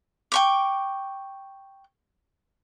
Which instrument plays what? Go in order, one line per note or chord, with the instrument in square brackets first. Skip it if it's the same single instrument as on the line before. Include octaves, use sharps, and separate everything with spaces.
[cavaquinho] G5 C#6 D6